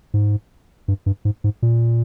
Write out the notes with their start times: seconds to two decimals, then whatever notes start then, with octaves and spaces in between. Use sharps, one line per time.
0.14 G#2
0.88 G2
1.06 G2
1.25 G#2
1.44 G#2
1.62 A#2